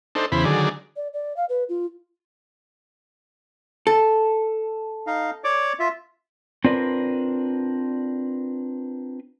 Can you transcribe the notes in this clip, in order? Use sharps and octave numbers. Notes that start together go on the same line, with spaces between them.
D4 D#4 A4 C5
E2 C#3 E4 C5 B5
D3 D#3 F#3 G#4 D5
D5
D5
F5
B4
F4
A4
D#4 F5
C#5 D5 D6
F4 E5
C4 D4 F4 A#4 B4 D5